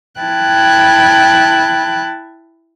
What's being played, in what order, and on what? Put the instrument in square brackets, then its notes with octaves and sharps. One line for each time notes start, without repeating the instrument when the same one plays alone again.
[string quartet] E4 G5 A5 B5 F#6 G#6